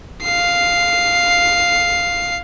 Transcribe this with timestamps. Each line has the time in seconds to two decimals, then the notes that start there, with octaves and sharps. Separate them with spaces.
0.23 F5 C7